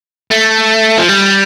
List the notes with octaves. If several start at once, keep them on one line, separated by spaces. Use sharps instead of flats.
A3
F3
G3